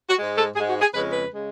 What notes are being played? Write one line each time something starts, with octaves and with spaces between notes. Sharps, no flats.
F#4
G#2 G#3
A4
G#2 G#3 G#4
F#4
G#4
F2 C#3 G#3 B4
B4
C#3 G#3